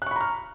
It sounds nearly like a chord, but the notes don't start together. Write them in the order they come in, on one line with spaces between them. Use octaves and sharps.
F#6 C#6 B5 A#5 F6